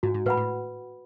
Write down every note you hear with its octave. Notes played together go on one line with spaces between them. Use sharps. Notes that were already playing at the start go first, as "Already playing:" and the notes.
G#2 F#4
G#2
A2 B4 F#5 B5
A2